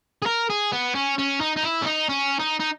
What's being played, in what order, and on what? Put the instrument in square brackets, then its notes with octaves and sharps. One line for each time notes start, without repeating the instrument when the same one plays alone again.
[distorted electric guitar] G#4
A#4
G#4
B3
C#4
C#4
D#4
D#4
E4
C#4
D#4
C#4
D#4
D#4